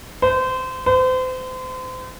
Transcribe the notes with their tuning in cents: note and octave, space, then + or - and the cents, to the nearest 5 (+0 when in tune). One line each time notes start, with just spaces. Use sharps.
C5 -25
C5 -35